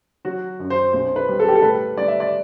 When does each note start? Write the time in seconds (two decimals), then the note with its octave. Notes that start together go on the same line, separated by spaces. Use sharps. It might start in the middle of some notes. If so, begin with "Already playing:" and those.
0.25 F#3 F#4
0.60 F#2
0.70 C5
0.93 B1 C5
1.16 B4
1.29 G3
1.40 A4
1.48 G4
1.55 A4
1.62 A2 B4
1.97 G3 D5
2.08 E5
2.20 D5